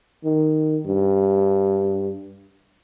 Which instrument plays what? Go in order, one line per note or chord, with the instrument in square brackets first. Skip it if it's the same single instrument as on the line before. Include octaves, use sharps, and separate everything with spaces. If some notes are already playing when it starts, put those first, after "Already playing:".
[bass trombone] D#3
G2